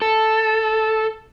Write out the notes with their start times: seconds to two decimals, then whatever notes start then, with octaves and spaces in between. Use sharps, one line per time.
0.02 A4